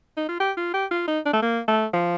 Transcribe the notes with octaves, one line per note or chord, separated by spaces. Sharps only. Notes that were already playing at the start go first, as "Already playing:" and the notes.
D#4
F4
G4
F4
G4
F4
D#4
D4
A3
A#3
A3
F3